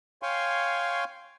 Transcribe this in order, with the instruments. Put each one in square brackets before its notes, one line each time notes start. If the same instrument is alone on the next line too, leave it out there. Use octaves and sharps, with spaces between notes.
[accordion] C#5 F5 G5 G#5 C6 C#6